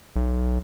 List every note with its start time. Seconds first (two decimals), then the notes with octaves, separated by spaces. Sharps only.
0.16 B1